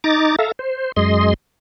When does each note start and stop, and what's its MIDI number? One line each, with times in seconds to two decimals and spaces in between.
0.04 0.36 63
0.04 0.36 82
0.04 0.36 86
0.04 0.36 93
0.39 0.52 69
0.39 0.52 76
0.39 0.52 77
0.39 0.52 82
0.59 0.92 72
0.96 1.34 42
0.96 1.34 56
0.96 1.34 75
0.96 1.34 84